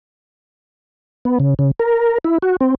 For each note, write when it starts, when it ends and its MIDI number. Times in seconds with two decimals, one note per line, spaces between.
1.25 1.39 59
1.40 1.54 49
1.59 1.71 49
1.79 2.18 70
2.25 2.38 64
2.42 2.56 66
2.61 2.75 60